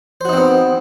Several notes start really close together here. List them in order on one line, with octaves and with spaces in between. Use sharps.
C5 F#4 D#4 C4 B3